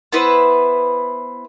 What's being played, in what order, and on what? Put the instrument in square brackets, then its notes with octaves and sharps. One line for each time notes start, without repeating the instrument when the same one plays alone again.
[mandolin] B3 E4 B4 C5